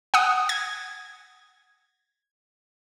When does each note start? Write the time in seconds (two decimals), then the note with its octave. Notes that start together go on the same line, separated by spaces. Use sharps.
0.14 F#5 D#6
0.49 G#6